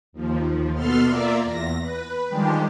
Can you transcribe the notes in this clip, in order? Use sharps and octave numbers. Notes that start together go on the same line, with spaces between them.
D#2 F3
B2 B3 A4 C6 F6
A#3 F4 A#4 D5 E5
E2 A#6
B4
D#3 F3 G3 G#3 D4 G4